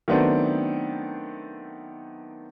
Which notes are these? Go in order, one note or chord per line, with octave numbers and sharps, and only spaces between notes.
D#3 F#3 A3 B3 C4 D4